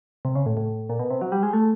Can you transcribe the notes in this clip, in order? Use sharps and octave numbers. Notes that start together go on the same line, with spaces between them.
C3
C#3
A2
A2
A#2
B2
C3
F#3
G3
G#3
A3